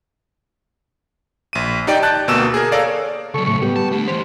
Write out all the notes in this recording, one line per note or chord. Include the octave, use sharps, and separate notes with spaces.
A#1 D#7
D#4 G4 D5 G5
A5 F#6 G6 A6
D2 B2 A#3 E6 E7
G#4 A#4
A4 A#4 C#5 D5 F5
C#2 F#3 A4 C#6
A2 C#6
G3 B3 G4
A5
A3 D4
E3 G4 C5